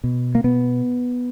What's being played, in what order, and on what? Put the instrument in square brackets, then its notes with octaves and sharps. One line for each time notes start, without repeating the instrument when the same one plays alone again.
[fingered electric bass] B2
A#3
B2 B3